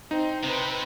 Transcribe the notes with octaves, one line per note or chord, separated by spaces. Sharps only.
C4 D#4
C3 B4 C5